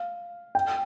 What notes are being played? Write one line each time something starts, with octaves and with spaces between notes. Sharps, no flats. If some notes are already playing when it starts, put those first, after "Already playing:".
Already playing: F5
G5